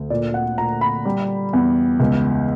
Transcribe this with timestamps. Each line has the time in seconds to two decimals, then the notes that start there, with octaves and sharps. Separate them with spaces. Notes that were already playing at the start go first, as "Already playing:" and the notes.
Already playing: D2
0.10 A#2 D5
0.34 F#5
0.58 A#2 A#5
0.81 B5
1.05 G3
1.53 E2
2.00 C#2